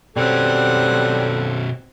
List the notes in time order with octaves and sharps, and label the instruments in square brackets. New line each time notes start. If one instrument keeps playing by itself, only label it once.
[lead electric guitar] B2 C#4 [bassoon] G3 [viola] C4 F#5 [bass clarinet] A4